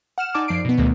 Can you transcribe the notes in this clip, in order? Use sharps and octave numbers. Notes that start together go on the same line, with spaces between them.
F#5 F6 E7
D#4 D5 G#5 A5 D6
F#2 F3 D5 C7 D7
B2 B3
D2 B2 D#3 A3 B3